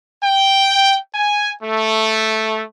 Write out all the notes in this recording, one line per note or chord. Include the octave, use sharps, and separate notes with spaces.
G5
G#5
A3